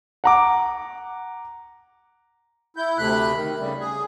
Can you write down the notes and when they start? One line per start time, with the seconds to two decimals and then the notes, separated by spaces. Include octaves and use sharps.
0.24 F#5 A#5 D6
2.77 E4 G6
2.98 D2 C3 A3 B5 F#6
3.34 D#3
3.59 C#3 G3
3.80 G#4